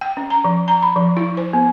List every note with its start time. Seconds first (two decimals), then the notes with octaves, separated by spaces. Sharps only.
0.01 G5
0.17 C#4
0.30 A#5
0.45 F3
0.68 A#5
0.82 B5
0.96 F3
1.17 E4
1.37 C5
1.53 B3